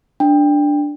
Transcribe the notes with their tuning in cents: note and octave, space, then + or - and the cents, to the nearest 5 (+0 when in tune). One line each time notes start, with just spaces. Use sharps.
D4 +0 G5 +20